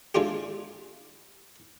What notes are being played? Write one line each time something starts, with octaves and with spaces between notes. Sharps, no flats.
G#3 D4 E4 F4 G4